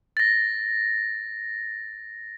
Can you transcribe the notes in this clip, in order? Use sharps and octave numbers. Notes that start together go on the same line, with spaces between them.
A6 A#6